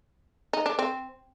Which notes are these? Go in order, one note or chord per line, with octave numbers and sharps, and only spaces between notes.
D#4
D4
C4